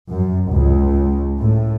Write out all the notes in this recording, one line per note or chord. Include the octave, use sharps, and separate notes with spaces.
F#2
C#2
A2